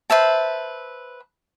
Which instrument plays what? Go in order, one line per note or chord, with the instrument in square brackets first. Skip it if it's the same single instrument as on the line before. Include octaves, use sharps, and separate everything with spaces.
[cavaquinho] B4 C5 E5 A5